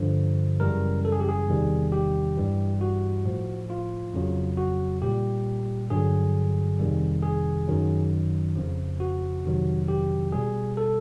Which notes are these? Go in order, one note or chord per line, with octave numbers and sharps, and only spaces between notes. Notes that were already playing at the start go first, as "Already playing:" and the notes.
Already playing: G2 D3 F3
F#2 C#3 E3 G3 A#4
A4
G#4
G4
G#4
E2 C3 D#3 G3
G4
G2 E3 G3
F#4
A2 F3
F4
F2 C#3 F#3
F#4
A#2 G3 G4
G2 D3 F#3 G#4
F2 C3 D#3 G3
G#4
F#2 D#3 F#3
F2 C#3 F3
F#4
F2 C3 D#3 F#3
G4
B2 G3 G#4
A4